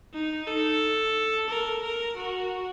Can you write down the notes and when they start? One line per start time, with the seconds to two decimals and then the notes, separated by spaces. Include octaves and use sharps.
0.13 D#4
0.47 A4
1.49 A#4
1.83 A#4
2.17 F#4